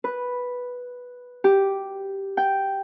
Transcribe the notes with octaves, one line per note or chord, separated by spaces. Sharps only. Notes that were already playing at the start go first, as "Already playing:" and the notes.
B4
G4
G5